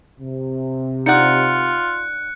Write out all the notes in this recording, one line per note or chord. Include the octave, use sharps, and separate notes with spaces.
C3
D#4 F4 D5 F#5 F#6 C#7